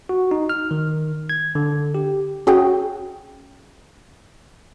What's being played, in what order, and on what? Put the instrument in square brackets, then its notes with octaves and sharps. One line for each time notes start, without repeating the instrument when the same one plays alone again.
[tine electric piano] F#4
D#4
F6
D#3
G#6
D3
G4
[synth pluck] C#4 F#4 G#4 F#5 G5